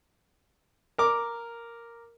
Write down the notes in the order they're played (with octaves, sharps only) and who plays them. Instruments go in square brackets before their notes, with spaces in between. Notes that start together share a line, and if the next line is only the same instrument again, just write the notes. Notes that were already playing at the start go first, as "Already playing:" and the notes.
[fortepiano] A#4 D6